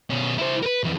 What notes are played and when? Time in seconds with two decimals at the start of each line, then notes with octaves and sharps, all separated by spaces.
0.10 B2 C#4
0.38 E4 C5
0.62 A#4 B4
0.84 F2 E3